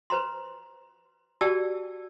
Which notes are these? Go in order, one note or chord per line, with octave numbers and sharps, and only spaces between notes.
B4 C5 A#5 C6
F#4 G4 D5 G5 A5 E6